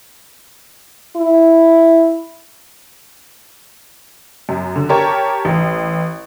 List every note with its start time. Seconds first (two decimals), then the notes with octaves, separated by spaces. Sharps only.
1.16 E4
4.49 F#2
4.76 D3
4.89 G4 A#4 C#5 A5
5.45 A1